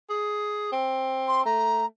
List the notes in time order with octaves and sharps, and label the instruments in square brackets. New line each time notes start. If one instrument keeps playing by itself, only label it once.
[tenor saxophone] G#4
C4
[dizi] C6
[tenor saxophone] A3 [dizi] A#5